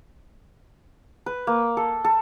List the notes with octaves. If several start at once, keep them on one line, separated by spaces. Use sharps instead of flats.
B4
A#3
A4
A4